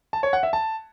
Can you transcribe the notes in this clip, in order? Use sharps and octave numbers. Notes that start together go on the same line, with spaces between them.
A5
C#5
F#5
E5
A5